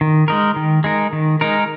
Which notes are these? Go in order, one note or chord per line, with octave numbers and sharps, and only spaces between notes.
D#3
G#3 D#4 A#4
D#3
G#3 D#4 A#4
D#3
G#3 D#4 A#4